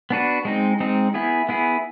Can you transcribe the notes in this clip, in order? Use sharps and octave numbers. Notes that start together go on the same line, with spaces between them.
B3 D4 F#4 B4
G#3 C4 D#4
G#3 C4 D#4
B3 E4 G#4
B3 E4 G#4